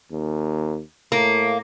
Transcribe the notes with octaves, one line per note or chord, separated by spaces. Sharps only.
D#2
A2 A#3